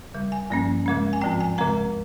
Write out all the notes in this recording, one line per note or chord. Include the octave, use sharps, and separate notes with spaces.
D#2 C#3 G3
G#5
G2 F3 A#3 C#4
D#2 C#3 G#3 C#4
G#5
G#2 F3 C4 G5
G#5
D#2 C#3 G#3 C4 A#5